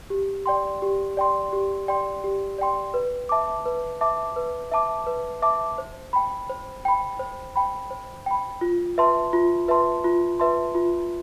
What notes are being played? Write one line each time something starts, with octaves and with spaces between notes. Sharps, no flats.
G4
D5 G5 C6
G4
D5 G5 C6
G4
D5 G5 C6
G4
D5 G5 C6
B4
E5 A5 D6
B4
E5 A5 D6
B4
E5 A5 D6
B4
E5 A5 D6
C5
G5 B5
C5
G5 B5
C5
G5 B5
C5
G5 B5
F4
B4 E5 A5 C6
F4
B4 E5 A5 C6
F4
B4 E5 A5 C6
F4